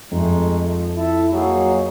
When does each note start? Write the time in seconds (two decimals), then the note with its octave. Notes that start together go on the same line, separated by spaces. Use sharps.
0.11 F2 G#3 A3 D#4
0.61 F3
0.97 E4 A4 E5 A5
1.32 F#3 A#3 D#4 G#4